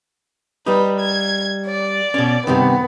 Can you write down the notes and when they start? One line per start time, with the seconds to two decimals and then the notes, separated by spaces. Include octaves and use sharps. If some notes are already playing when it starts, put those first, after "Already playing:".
0.66 G3 D#4 B4
0.99 G#6
1.66 D5
2.14 B2 C#4
2.47 G2 C3 D#3 B3